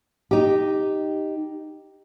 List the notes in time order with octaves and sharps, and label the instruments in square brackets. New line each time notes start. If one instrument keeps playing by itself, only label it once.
[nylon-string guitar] D#4 G4